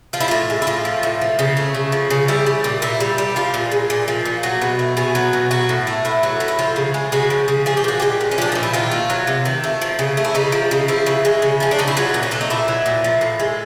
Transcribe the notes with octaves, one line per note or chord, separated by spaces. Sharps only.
F3 F4
E4
A2 F4
G#3
E4
A2 F4
F3
A2
F3
C#3
A3
C#3
F3
C#3
G3 E4
G3
A#2
A#2 E4
G3
G3
F3 F4
A#2
G#3
A#2
F3
A#2
F#3 F#4
B2
A3
B2 G#4
F#3
B2
F#3 F#4
A2
A3
A2 E4
F#3
A2
E4
F3 F4
C#3
G#3
C#3 F#4
F3
C#3
F3 G#4
G4
A#2 F#4
G#3 G4
A#2
C#4
F3 D4
A#2 D#4
E4
D#3 F4
A3
F#3
C3
D#3
A3
F3
C#3
A3
E4
C#3 D#4
F3
C#3
F3 E4
C#3
G#3
C#3
F3 C#4
D4
C#3 D#4
E4
F#3 F4
A#2
C#4
A3 D4
D#4
A#2 E4
F#3
A#2
F3
A2
G#3